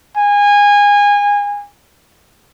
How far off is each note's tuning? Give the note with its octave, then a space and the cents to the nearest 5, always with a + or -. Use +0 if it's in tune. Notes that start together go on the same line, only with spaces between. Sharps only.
G#5 -25